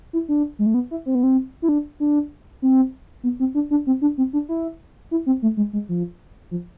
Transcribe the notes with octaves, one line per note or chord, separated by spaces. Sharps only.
E4
D4
G#3
A3
B3
E4
C4
B3
C4
E4
D4
D4
C4
B3
C4
D4
D4
C4
D4
C4
D4
E4
E4
C4
A3
G#3
G#3
F3
F3